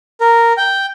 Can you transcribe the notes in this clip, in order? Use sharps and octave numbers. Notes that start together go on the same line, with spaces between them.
A#4
G5